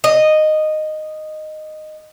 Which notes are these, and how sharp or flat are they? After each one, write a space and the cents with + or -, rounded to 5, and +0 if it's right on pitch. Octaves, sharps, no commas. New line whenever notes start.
D#5 -10